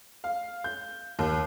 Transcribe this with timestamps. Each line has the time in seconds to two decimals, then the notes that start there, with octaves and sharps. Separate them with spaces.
0.24 F5
0.64 G6
1.19 D#2